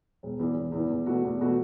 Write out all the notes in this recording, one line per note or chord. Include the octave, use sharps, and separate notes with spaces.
E1
E2 E3
E1
E2 E3
E2
B2 A3 F#4
E2
B2 A3 F#4